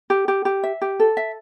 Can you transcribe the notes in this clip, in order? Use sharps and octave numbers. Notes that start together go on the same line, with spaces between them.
G4
G4
G4
E5
G4
A4
E5